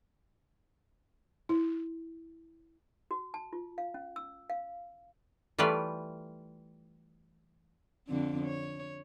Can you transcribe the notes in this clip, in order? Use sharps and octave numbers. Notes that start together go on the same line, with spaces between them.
E4
F#4
A5
F4
F5
C#4
E6
F5
E3 G3 A3 F4 B4 D5
F2 D3 C4
C#5